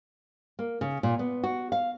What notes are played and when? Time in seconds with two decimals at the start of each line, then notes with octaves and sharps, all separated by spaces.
0.59 A#3
0.81 C#3
1.03 A#2
1.19 B3
1.44 F#4
1.72 F5